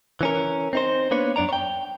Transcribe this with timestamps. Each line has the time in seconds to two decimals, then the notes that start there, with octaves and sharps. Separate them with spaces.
0.21 E3 C#4 A#4
0.73 C4 D#4 C5
1.11 A#3 B3 D4 B4 C#5
1.36 F#2 D4 D5 A#5
1.49 C#5 G5